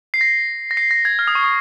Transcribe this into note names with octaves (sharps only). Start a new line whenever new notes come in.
C7
A#6
A#6
C7
A#6
G#6
F6
D#6
C#6
D#6